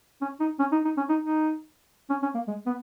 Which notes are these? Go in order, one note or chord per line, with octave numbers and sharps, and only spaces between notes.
C#4
D#4
C#4
D#4
D#4
C#4
D#4
D#4
C#4
C#4
A#3
G#3
B3